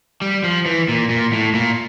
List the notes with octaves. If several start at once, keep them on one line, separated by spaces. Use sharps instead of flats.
G3
F3
E3
A#2
A#2
A2
A#2